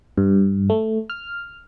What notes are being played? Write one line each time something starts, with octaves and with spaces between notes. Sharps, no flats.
G2
A3
F6